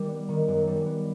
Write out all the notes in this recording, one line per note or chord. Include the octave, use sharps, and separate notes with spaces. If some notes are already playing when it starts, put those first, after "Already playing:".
Already playing: D#3 G3 G4
B3
D#3
F#2
G3
B3